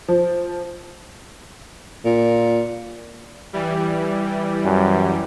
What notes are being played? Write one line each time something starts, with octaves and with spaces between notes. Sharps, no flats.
F3
A#2
E3 G3
F#2